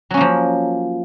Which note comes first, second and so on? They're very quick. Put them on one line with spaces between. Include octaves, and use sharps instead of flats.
F#3 C#4 A#3 F3